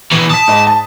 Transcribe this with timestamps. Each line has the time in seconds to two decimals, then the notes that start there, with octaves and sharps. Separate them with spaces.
0.11 B2 E3
0.30 A5 D#6 B6
0.48 G#2 D#5
0.67 A5